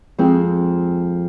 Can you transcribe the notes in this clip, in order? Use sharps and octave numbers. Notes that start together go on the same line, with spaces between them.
F2 F3 G#3 C4 G#4